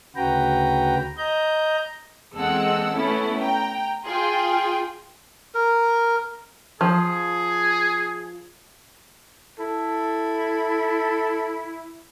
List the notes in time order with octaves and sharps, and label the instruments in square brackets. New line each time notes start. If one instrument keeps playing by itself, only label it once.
[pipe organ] D2 C#3 F#4 B4 G5 A#5
D#5 A#5 G6
[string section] E2 G#3 C4 A4 F#5 E6
A3 B3 C#4 E4 A4
G5 A#5
F4 G#4 G5 C6
[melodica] A#4
[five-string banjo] F3 [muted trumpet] G#4
[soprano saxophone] E4 [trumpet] A4